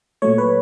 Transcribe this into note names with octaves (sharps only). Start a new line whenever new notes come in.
A#2 F#3 A3 C#5
B4